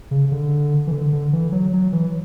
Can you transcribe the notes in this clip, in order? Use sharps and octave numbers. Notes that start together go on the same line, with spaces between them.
C#3
D3
E3
D3
D3
E3
F#3
F#3
E3